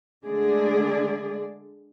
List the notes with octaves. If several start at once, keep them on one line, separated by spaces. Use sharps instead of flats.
D3 G#3 A3 D4 G#4 D5